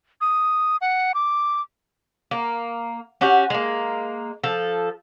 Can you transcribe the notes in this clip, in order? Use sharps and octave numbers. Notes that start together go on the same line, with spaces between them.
D#6
F#5
D6
A#3
C#4 F#4 G4
G#3 A#3
F3 A4